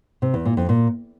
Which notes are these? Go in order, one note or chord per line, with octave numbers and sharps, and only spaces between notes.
C3
E2
A#2
F2
A#2